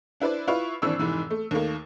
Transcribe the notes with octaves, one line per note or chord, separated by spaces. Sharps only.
D4 E4 B4 C5 D5
E4 F4 B4 C#6
G#1 E3 C4 D4 C#6 E6
F1 G#2 E3
A3
D#2 D#3 A3 A#3